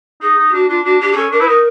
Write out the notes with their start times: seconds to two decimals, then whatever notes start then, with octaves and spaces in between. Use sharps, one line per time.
0.22 D#4 G#4
0.38 D#4
0.49 G4
0.53 D4 F#4
0.69 D4 F4
0.85 D4 F#4
1.00 D4 G4
1.12 G#4
1.15 C#4 A4
1.31 D4 A#4
1.40 E4 B4
1.47 D#4 A#4